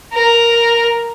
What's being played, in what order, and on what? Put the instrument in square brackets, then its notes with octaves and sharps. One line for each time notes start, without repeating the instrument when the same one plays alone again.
[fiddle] A#4